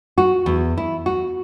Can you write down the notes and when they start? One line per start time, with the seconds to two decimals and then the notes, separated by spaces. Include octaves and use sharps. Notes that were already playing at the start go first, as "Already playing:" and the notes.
0.18 F#4
0.46 E2
0.78 E4
1.06 F#4